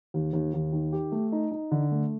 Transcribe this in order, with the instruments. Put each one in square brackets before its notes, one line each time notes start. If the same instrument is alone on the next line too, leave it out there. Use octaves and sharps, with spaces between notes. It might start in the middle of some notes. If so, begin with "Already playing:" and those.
[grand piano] D#2
D#2
D#2
D#3
G4
A3
D#4
D#4
D3
A3